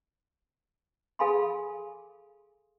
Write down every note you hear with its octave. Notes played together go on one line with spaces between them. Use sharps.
G#4 A4 F5 G#5 B5 C6